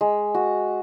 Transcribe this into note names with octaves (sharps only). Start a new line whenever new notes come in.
G#3
F#4